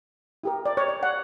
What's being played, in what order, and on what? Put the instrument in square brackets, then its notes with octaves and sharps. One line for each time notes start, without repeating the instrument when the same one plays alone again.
[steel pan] E4 G4 A#4
D5
C#5
D5
F#5